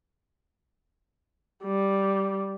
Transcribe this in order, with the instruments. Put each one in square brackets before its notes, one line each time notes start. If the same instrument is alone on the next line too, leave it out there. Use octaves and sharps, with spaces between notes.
[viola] G3